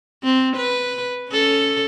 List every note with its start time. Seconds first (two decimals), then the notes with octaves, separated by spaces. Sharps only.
0.23 C4
0.57 B4
1.30 C#4 A4